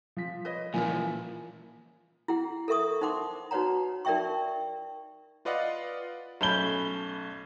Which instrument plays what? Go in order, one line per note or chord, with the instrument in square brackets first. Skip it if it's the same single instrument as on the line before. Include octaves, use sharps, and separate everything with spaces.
[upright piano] F3 B6
[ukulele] B4 C#5 D#5
[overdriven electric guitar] A#2 E3 [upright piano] F3 [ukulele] A#4 E5 G#5
[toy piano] E4 G#4 F#5
A4 A#4 E5 C#6 D#6
D#4 C5 F#5 C6 D6
D#4 F#4 B4 C#5 F#5 A#5
D#4 A#4 D5 E5 G5 C#6
[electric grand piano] F4 B4 D5 D#5 F5 F#5
[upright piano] B1 A3 C#4 B5 G6 G7